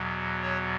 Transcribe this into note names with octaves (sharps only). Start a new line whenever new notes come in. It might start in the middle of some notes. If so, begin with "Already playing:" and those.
Already playing: E2 B2 F#3
C#5